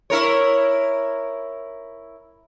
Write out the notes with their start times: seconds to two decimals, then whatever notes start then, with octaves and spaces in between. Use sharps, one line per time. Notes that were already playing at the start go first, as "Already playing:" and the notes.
0.10 E4 A#4 C#5